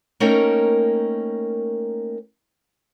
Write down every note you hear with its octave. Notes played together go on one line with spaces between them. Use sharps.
A3 A#3 C#4 D#4 A#4 G5